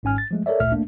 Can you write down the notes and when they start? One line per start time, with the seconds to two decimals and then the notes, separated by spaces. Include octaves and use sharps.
0.03 G#1 G#2 C#4 G#5 F6
0.18 A6
0.31 F3 G#3 A3
0.46 A4 A#4 C#5 D5 E5
0.60 G#1 D2 A#2 A3 E5 F6
0.72 A3 A#3 D4